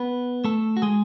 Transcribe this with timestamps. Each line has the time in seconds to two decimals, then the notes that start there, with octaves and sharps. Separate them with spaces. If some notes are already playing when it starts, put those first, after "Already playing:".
Already playing: B3 B4
0.44 A3 A4
0.77 F#4
0.82 G#3 G#4